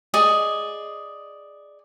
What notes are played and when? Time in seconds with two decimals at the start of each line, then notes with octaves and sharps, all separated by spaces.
0.14 G#4 D5 D#5